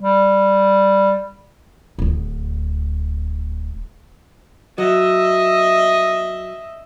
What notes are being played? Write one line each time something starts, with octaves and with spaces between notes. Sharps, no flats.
G3
D1 D2
F#3 D#5 E5